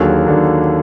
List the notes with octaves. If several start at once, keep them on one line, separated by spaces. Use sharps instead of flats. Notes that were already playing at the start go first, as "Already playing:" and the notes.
Already playing: D#2 D3 F#3 G#4
D#2 D3 F#3